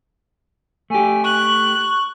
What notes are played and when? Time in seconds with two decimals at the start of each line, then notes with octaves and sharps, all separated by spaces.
0.90 A3 G4 G#5
1.24 C#6 F#6